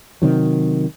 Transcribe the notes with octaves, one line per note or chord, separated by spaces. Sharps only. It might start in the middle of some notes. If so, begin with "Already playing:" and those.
C3 D#3 F#3